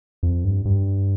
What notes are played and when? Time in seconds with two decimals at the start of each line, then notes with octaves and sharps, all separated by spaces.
0.23 F2
0.45 G2
0.65 G2